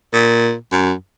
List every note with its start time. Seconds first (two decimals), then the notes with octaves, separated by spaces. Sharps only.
0.14 A#2
0.72 F#2